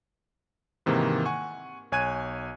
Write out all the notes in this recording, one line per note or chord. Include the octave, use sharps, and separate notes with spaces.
G#2 C3 D#3 E3 A#3
F#5 G#5 C#6
B1 C#5 G#5 F#6 G#6 D#7